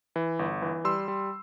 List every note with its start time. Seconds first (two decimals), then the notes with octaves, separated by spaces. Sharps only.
0.16 E3
0.39 G1
0.62 E3
0.85 G3 C6 E6
1.08 G3